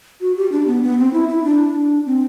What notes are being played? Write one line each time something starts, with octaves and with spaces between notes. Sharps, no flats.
F#4
G4
D4
B3
B3
C4
E4
E4
D4
C4